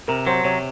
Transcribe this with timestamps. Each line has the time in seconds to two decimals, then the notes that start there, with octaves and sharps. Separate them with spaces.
0.08 C3 A#4
0.27 F#3 C5
0.44 C3 C#5